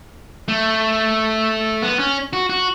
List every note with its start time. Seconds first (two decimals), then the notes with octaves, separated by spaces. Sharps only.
0.48 A3
1.82 B3
1.99 C#4
2.33 F#4
2.50 F#4